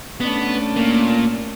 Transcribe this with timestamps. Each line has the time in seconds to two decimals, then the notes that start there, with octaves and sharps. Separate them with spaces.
0.21 A3 B3 C#4 D4
0.77 A#2